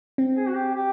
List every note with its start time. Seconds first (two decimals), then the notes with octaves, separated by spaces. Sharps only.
0.18 C4
0.37 G#4
0.48 F#4
0.56 G4
0.75 G4